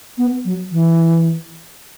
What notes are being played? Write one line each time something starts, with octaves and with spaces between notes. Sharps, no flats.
B3
F#3
E3